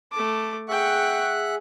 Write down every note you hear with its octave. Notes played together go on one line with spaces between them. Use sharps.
A3 A5 D6
G#4 E5 F#5 G5 C#6 F#6